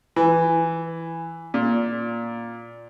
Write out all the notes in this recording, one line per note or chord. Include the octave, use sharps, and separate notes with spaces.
E3
A#2